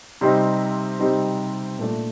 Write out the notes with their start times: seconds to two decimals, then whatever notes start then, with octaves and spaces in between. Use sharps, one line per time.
0.21 C3 G3 C4 D#4
0.99 C3 G3 C4 D#4
1.79 A#2 A3 D4